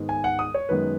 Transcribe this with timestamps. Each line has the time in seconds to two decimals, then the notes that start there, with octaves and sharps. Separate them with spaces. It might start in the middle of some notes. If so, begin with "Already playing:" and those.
Already playing: G#2 D#3 G#3 B3
0.09 G#5
0.24 F#5
0.39 D#6
0.54 C#5
0.69 F#2 D#3 G#3 B3 B4